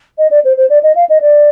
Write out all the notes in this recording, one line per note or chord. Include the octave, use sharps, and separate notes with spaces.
D#5
D5
C5
C5
D5
D#5
F5
D#5
D5